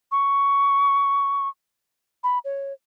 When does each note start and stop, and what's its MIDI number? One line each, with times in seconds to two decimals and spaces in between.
0.12 1.48 85
2.24 2.39 83
2.45 2.73 73